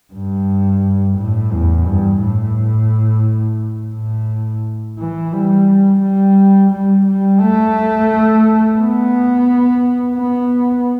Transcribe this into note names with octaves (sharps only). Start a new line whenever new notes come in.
G2
A2
E2
G2
A2
A2
E3
G3
G3
G3
G3
A3
B3
B3